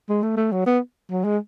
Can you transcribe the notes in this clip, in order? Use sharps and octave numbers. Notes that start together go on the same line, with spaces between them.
G#3
A3
A3
F#3
B3
F#3
G#3